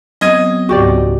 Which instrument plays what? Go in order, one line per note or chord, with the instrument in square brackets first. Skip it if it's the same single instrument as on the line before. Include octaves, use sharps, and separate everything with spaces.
[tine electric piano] F#3 B3 C4 [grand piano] D#5 G#6 D#7
[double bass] C#2 G#2 [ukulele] F#4 G4 D5